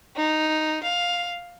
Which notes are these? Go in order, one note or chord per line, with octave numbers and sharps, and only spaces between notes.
D#4
F5